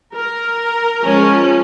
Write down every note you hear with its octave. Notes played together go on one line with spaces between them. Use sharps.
A#4
F3 G#3 C#4